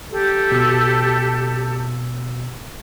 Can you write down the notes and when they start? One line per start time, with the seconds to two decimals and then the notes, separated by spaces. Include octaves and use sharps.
0.11 G4 A4
0.52 B2 E6